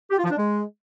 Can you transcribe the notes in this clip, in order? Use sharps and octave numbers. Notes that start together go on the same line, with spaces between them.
G4
F4
F3
D4
G#3